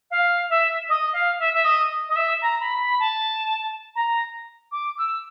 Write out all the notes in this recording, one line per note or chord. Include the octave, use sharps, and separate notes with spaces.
F5
E5
D#5
F5
E5
E5
D#5
D#5
E5
A#5
B5
B5
A5
A#5
D6
E6